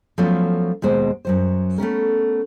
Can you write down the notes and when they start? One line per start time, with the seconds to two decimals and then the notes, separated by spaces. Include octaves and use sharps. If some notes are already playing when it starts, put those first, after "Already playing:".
0.18 F3 F#3 A3 B3 C#4 F4
0.82 D#2 B2 G#3 C5
1.25 F#2 F#3 C5
1.78 A3 B3 C#4 A#4